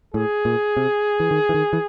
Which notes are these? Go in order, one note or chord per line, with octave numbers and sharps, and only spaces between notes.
A2 G#4
A#2
C3
E3
D#3
E3
D#3
E3